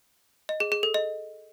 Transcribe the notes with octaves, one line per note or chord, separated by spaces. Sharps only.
D#5
G#4
G#4
A4
D#5